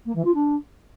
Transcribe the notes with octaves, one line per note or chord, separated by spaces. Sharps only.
A#3
E3
F4
D4